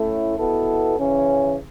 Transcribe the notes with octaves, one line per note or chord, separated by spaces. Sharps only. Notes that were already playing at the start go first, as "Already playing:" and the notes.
Already playing: A2 A3 C#4 E4 A4
B2 B3 E4 A4
C#3 E3 C#4